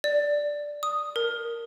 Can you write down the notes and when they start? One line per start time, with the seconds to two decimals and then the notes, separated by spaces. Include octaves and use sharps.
0.04 D5
0.83 D#6
1.16 A#4